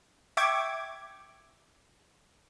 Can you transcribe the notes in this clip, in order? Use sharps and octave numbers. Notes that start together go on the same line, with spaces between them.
E5 G5 C#6 D6 G#6